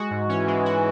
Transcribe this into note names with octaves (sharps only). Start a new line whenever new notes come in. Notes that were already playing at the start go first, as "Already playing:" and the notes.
Already playing: G#3 F#4
G#2
E3 C#4
G#3
F#4